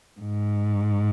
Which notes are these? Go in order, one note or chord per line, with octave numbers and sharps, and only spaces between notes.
G#2